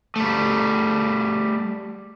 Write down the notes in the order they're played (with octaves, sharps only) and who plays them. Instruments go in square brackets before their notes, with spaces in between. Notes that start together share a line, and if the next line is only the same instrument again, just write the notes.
[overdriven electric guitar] G3 A3